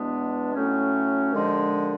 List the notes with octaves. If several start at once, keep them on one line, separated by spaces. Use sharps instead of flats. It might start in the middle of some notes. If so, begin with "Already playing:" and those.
Already playing: E2 B2 G#3 B3 D4
A2 F#3 A3 C#4
D#2 D3 F3 G#3